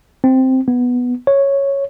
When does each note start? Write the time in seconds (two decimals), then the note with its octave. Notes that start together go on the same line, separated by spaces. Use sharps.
0.24 C4
0.68 B3
1.27 C#5